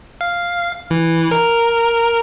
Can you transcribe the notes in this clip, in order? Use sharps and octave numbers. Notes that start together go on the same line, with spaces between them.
F5
E3
A#4